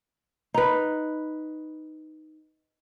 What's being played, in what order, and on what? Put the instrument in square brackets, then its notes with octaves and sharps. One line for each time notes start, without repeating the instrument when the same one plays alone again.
[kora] D#4 B4